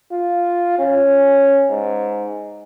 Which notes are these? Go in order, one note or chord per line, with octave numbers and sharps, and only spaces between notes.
F4
C#4
G#2